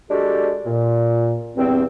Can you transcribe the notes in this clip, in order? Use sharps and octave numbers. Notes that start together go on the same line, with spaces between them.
G#3 D4 F#4 G4 A4
A#2
E2 G2 C4